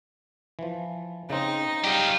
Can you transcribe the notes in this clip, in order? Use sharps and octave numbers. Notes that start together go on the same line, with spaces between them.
E3 F3
C#3 C4 D#4
G3 F4 G4